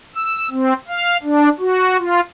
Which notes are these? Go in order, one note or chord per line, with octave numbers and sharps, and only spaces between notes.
E6
C4
F5
D4
F#4
F4